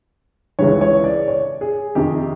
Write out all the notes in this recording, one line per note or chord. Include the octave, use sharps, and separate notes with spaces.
C#2 C#3 E3 C#5
C#5
D5
C#5
G#4
F2 C3 D#3 G4